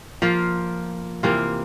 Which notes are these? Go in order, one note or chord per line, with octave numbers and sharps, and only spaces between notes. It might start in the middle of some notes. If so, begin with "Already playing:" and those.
F3 A#3 F4
C3 E3 A#3 F4